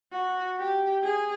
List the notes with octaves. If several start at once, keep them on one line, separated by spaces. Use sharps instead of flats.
F#4
G4
G#4